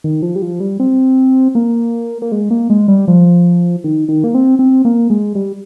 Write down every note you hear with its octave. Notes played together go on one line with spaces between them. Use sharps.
D#3
F3
G3
F3
G3
C4
A#3
A#3
G#3
A#3
G#3
G3
F3
D#3
D#3
A#3
C4
C4
A#3
G#3
G3